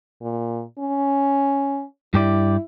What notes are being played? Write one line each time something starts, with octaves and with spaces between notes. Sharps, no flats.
A#2
C#4
G2 E4 G4 D5